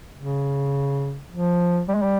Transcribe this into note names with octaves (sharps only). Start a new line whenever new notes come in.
C#3
F3
G3
G#3
G3